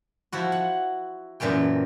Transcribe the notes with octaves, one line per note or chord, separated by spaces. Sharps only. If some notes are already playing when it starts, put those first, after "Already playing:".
F3 E4 F#4
F#5
F#2 A#2 E3 A3 G5